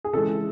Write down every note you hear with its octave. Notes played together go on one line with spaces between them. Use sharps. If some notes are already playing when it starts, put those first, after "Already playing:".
G#4
C#3 E3 G#3 A4